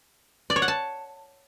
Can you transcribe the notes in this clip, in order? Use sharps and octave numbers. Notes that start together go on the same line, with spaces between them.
D5
C#5
F#5
A5